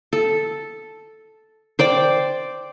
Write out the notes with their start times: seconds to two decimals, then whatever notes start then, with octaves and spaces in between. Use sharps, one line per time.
0.13 A4
1.79 C5 D5 G5